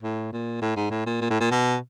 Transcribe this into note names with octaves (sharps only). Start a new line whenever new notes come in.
A2
A#2
A2
G#2
A2
A#2
A#2
A2
A#2
B2